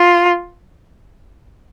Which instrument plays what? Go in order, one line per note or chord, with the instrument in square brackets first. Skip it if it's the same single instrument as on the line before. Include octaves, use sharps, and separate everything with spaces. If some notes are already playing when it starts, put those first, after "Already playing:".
Already playing: [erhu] F4